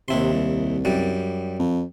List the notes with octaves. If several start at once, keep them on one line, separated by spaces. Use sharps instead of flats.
D#2 C3 E4 C6
C2
F#2 G3
F2